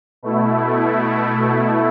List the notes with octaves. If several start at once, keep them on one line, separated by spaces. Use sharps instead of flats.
B2 A3 E4